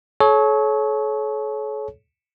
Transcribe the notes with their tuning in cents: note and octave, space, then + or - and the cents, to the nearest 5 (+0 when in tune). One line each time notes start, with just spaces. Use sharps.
A4 -45 C#5 +0